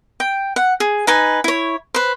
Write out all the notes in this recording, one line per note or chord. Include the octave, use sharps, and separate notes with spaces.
G5
F#5
G#4
D#4 B4 G#5
E4 C#5
B4 C5